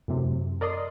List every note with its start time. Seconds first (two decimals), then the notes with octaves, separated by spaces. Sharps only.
0.08 F#2 A2 C3
0.61 A#4 D5 D#5 C6 D#6